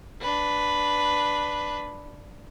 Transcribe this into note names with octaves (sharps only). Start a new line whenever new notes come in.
D4 B4